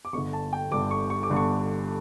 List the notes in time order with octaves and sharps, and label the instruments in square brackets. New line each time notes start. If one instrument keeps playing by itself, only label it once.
[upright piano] D6
G1 G2 D3 C#6
A5
G5
G1 G2 D3 D6
C#6
C#6
D6
G1 G2 D3
C#6